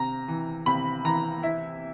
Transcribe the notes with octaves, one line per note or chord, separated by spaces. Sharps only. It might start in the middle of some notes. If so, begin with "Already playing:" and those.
Already playing: C3 A#5
E3
C3 B5
E3 A#5
E4 E5